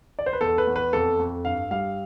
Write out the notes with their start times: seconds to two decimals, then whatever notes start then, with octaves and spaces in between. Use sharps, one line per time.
0.19 D5
0.26 C5
0.33 B4
0.41 E2 A4
0.58 B4
0.67 E2
0.76 B4
0.93 F2 A4
1.19 F2
1.45 G2 F5
1.71 G3 F5